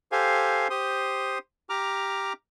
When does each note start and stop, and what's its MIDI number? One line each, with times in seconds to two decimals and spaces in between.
0.12 0.68 67
0.12 0.68 69
0.12 0.68 72
0.12 0.68 77
0.12 0.68 80
0.70 1.38 67
0.70 1.38 72
0.70 1.38 84
0.70 1.38 87
1.70 2.33 67
1.70 2.33 82
1.70 2.33 86
1.70 2.33 89